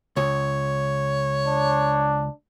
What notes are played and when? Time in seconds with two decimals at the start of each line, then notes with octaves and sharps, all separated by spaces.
0.17 C#2 C#5
1.47 D4